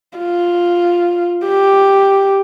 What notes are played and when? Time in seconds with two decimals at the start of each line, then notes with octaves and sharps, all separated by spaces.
0.18 F4
1.46 G4